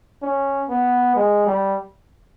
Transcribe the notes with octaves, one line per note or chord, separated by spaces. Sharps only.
C#4
B3
G#3
G3